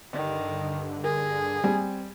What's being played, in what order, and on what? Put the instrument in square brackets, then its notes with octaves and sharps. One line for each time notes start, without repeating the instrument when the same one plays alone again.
[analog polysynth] G2 D3 [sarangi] D#3
[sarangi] G#4 [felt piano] A#4
[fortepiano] G3 [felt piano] C4 G#5